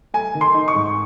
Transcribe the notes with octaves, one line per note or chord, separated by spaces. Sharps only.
A3 G#5
D#3
C6
D#4
C#6
G#2